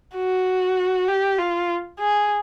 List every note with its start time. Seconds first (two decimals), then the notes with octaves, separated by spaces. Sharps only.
0.16 F#4
1.08 G4
1.38 F4
1.99 G#4